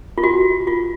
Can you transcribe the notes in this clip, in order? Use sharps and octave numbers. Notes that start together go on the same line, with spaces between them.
F4
F#4
F4